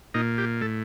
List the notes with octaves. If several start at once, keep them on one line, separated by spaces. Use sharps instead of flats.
A#2 D#4
G4
A2 A4